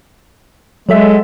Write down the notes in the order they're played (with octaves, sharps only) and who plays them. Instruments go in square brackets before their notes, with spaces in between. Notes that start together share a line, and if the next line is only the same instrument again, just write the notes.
[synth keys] F#3 A4 E5 [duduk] G#3